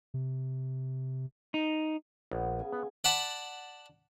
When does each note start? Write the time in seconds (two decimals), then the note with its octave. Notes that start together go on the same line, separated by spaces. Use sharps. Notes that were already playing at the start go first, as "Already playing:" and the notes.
0.14 C3
1.54 D#4
2.31 A#1 B3
2.59 C#3 G#5
2.72 B3
3.04 D5 F#5 A5 B5